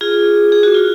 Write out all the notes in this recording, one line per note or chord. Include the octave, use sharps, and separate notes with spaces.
F4 G#4
G#4
F#4
F4